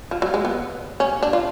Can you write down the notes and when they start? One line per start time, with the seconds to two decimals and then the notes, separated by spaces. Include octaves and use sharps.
0.11 F3
0.22 F#3
0.34 G#3
0.45 B3
1.00 C#4
1.23 D4
1.33 F4